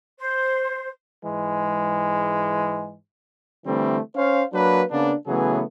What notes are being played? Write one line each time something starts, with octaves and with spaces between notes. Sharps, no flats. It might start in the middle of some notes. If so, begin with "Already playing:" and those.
C5
G#2 E3 G#3
D3 E3 G3 A3 C4
C#4 C5 C#5 F5
F#3 A#3 D4 B4
C#3 A#3 B3 D4
C#3 E3 F#3 A3 B3 G#4